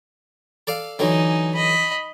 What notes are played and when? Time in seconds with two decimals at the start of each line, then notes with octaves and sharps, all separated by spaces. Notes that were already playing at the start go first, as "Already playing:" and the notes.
0.67 A4 D5 F5
0.99 D3 E3 F#3 D#4 G#5
1.55 D#5 B5